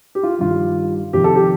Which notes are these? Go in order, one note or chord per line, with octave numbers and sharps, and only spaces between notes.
G4
F4
G2 D#3 F4
F2 C3 D#3 G4
A4
G4